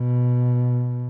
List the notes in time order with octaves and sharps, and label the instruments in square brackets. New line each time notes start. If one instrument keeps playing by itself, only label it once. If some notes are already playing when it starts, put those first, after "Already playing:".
Already playing: [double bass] B2